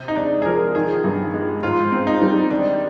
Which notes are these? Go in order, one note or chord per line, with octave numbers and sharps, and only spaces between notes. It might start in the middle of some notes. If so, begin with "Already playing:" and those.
Already playing: C3
D#4
G#3 D4
G#4
F3 A#4
D#3 G#4
G2
G#3
G#2 F4
C4
D#4
G3
D#3 D4